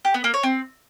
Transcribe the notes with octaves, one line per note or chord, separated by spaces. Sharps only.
G4
B3
A#3
C#5
C4